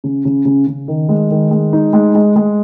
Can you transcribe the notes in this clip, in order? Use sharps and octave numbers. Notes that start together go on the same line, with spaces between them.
C#3
C#3
C#3
C#3
D#3
G#3
D#3
G#3
D#4
G#3
G#3
G#3